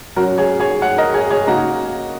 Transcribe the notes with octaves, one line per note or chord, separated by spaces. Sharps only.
F#2 F#3 C#4 F#4 A#4
G#4 C#5
G#4 C#5
C#5 F#5
A#4 D#5
G#4 C#5
G#4 C#5
C#3 A#3 D#4 F#4 A#4